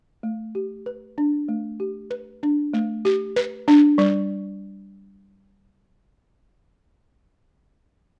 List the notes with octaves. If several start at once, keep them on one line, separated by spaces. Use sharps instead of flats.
A3
G4
B4
D4
A3
G4
B4
D4
A3
G4
B4
D4
G3